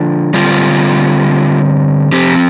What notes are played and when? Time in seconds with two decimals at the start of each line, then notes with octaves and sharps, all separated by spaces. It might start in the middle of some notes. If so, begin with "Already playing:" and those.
Already playing: D3 F3 D4
0.34 D3 G3 C4 F4
2.12 F3 C4 G4